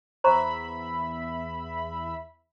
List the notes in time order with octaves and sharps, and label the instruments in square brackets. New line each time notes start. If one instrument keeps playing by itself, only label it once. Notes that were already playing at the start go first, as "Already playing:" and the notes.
[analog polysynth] E2 E5 B5 [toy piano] C5 A#5 C#6